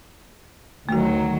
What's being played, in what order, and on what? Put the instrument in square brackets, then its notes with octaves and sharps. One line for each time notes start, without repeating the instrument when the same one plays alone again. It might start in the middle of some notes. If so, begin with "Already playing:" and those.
[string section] D2 D#3 F#3 [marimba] A3 F#4